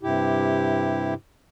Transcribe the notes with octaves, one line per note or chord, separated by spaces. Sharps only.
G2 C3 E4 G4